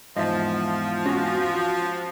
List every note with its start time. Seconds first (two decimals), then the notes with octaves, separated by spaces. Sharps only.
0.17 E2 G#2 F3 D#5 E5 A5
1.06 C#4 F#4 G#5